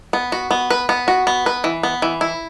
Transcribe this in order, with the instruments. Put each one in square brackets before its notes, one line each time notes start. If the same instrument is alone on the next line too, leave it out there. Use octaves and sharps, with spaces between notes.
[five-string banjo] B3
F#4
B3
B4
B3
F#4
B3
B4
E3
B3
E3
E4